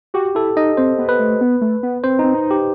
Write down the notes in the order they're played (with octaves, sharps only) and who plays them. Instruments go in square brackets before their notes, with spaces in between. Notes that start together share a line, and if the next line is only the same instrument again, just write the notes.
[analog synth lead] F#4 [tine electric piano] G4
[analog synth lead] E4 [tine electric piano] A4
[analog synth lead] D#4 [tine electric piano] D#5
[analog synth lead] C4 [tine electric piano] C5
[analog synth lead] B3
[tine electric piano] B4
[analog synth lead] A3
B3
A3
B3
[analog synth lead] C4 [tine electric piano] C5
[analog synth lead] C4 [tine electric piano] D#4
[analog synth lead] D#4
[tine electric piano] G4